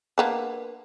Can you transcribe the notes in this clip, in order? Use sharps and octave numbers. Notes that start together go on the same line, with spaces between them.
A#3 B3 D4